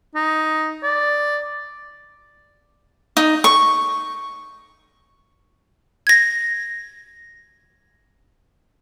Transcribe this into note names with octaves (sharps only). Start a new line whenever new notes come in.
D#4
D5
D#4
C#6
G#6 A#6